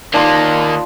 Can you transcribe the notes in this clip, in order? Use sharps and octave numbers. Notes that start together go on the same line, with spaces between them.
D#3 A#3 D4 F4 C6